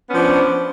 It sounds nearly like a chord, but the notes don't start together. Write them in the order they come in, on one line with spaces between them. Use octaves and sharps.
B3 C#4 F3 D4